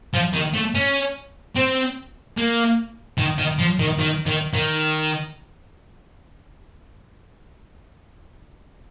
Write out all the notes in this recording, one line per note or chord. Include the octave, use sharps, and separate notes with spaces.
F3
D#3
A3
C#4
C4
A#3
D#3
D#3
F3
D#3
D#3
D#3
D#3